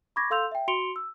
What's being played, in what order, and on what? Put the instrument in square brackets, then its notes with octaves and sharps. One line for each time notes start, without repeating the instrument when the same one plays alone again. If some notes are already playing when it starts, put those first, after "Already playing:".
[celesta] B5 C#6 D6 G#6 A#6
A4 F5 C6 E6 G6 F7
E5 G5
F#4 C6 C#7 D7 F7 G7
E6